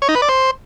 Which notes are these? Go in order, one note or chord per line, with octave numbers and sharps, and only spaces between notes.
C#5
D#4
B4
D5
C5